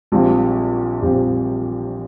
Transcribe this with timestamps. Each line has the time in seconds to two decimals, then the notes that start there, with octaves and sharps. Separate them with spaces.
0.12 A#1 A#2 G3 C4
1.02 A#1 A#2 G3 C4